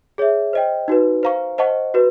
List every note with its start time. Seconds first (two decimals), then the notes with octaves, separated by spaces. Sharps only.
0.18 G#4 C#5 E5
0.53 C5 D#5 G5
0.88 D#4 F#4 B4
1.23 C5 F5 A#5 C#6
1.58 C5 D#5 F#5 A5 C#6
1.94 F#4 B4